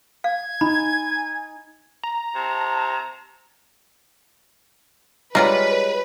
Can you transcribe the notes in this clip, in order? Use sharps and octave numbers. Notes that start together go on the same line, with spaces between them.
F5 G#6
D#4 G#5 B5
A#5
C3 A5
G3 G#3 F4 B4 C#5 D5 A#5